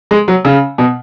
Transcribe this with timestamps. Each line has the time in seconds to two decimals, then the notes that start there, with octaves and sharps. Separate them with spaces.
0.11 G#3
0.28 F#3
0.45 C#3
0.78 B2